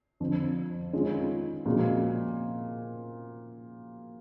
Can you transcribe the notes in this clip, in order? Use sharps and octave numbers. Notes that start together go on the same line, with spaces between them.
F2 D3 F3
D#3 G#3 C#4 F4
A#2 F3 G#3 C#4 F#4